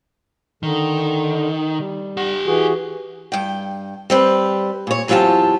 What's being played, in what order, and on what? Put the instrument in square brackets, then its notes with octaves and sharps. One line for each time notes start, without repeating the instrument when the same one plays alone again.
[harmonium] D3 [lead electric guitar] D#3
[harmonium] G3
[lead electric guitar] G4 F#5
[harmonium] E3 F#4 G#4
[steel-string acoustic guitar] G2 G5
G3 C4 B4
A#2 C#5
E2 F#3 C4 F4 G4 A5